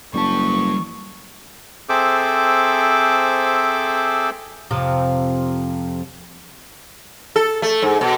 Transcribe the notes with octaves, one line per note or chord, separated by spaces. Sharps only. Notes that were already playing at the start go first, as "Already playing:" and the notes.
F#1 G3 A5 C#6
C4 G#4 A4 C5 E5 D6
F2 C3 F3
A4
A3
G#2
B2